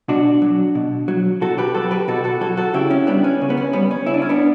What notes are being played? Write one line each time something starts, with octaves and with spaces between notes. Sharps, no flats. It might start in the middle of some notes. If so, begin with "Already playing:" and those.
B2 D4 F#4
F#3
B2
F#3
B2 F#4 A4
G4 B4
F#3 F#4 A4
G4 B4
B2 F#4 A4
F#4 A4
F#3 F#4 A4
F#4 A4
C#3 E4 G4
C#4 E4
G3 B3 D4
C#4
C#3
B3
C#4
G3 B3
C#4
C#3 E4
D4
C#4
B3 D4